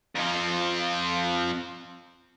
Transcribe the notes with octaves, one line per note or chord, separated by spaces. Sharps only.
F2 F3